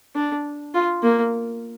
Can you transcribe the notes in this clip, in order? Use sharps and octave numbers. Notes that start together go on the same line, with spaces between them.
D4
F4
A#3